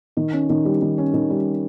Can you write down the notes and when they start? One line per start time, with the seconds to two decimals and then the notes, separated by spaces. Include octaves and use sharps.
0.17 D#3
0.33 C#4
0.49 D#3
0.65 G3
0.82 D#3
0.98 C#4
1.13 D#3
1.30 G3